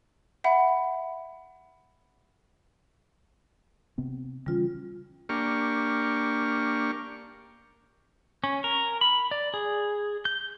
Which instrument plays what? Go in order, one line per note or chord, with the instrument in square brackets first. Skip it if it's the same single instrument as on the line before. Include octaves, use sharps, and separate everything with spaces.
[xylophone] E5 F#5 B5
[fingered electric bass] C3 B3 C4
[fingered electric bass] C#3 E3 C#4 [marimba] G3 F4
[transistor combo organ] A#3 D4 G4 C#6 F6
[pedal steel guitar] C#4
A#4
B5
D5
G#4
G6